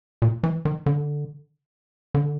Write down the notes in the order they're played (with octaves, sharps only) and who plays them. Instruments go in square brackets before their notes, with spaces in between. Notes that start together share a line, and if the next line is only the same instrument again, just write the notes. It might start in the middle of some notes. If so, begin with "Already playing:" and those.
[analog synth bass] A#2
E3
D#3
D3
D3